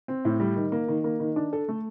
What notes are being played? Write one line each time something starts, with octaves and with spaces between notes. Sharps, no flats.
C4
A2
G3
D#3
A#3
D#3
A#3
D#3
D4
A4
A3